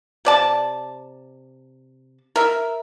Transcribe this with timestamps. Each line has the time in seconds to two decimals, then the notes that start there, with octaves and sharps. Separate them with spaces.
0.25 C3 D5 A5
2.36 A#4 E5